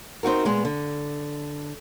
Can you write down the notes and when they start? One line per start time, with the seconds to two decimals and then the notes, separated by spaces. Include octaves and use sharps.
0.23 C4 D#4 F#4 A#4
0.45 A#2 G#3 B3
0.65 D3